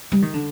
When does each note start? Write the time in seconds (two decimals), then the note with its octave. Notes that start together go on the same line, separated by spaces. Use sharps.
0.12 G3
0.22 D#3
0.33 D3